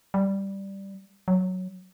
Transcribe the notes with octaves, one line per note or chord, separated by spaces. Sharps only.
G3
F#3